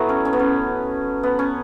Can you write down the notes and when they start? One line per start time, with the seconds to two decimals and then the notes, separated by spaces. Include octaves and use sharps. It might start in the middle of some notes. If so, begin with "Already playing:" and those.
Already playing: A2 F#3 A3 B3
0.09 C#4
0.25 C#4
0.33 B3
0.40 C#4
1.23 B3
1.39 C#4